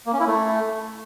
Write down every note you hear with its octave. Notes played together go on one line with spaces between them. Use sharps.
A#3
C#4
E4
A3